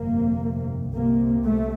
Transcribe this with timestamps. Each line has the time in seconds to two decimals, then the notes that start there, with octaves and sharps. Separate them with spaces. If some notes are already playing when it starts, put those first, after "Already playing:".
Already playing: G1 F2 C3 A#3
0.93 C2 C3 A#3
1.45 A3